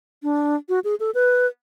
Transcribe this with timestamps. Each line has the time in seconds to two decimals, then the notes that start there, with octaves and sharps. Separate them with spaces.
0.23 D4
0.69 F#4
0.84 G#4
1.00 A4
1.15 B4